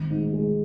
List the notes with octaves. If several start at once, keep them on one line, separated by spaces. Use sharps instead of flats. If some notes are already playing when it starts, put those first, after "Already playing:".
Already playing: G#1
G#2
G#3